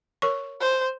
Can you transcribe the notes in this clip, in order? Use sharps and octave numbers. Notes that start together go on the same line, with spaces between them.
A#4 C#5 C#6
C5